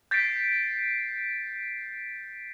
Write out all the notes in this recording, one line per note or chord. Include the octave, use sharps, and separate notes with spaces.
G6 A6 B6 C7 D7